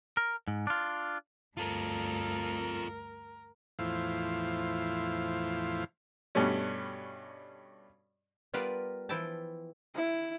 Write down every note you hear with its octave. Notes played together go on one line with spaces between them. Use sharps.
A#4
G#2
D4 F4
D2 G2 F4 A4 A#4
E2 A2 F3 E4 C5 F5
G2 B2 G3 A3 C#4
G3 B3 F4 A#4 B4 D5
E3 F3 E4 G5 A5
E4